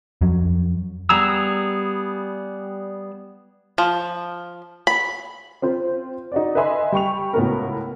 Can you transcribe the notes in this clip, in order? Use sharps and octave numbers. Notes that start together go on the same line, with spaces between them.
F2 F#3
G3 B3 G#4 A#5 E6
F3
B5
C4 F4 C5
D#4 F#4 D5
B4 D#5 E5 G#5 B5 C6
G3 G5 C#6 F7
C#2 A2 B3 F#4 A#4